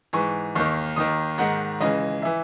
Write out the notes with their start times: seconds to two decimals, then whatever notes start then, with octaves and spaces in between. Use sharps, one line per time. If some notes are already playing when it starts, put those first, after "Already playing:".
0.13 G#2 E3 C#6
0.55 D#2 D#3 C#6
0.96 D#2 D#3 D#6
1.38 G#2 D#3 F#5
1.81 C#2 C#3 E3 D#5
2.22 E3 E5